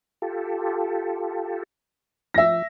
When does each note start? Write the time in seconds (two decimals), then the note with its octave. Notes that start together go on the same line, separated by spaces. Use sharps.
0.22 F4 G4 A4
2.34 F3 E5 A#6